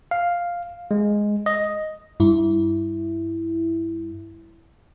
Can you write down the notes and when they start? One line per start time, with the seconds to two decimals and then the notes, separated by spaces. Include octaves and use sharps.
0.11 F5
0.91 G#3
1.46 D#5
2.20 G2 E4